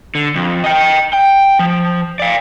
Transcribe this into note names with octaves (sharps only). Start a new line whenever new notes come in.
D3
F2
D#5 G5
G5
F3
D5 F5